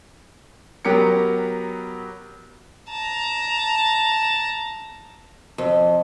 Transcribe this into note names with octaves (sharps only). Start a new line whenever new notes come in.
F#3 B3 G4 A#4 C#7
A5 A#5
F2